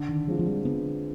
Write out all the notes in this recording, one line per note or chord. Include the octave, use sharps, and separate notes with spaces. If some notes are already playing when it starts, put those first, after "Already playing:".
Already playing: D3
D#3
F3 G#3 C4 F4
F3
G3
D3 B3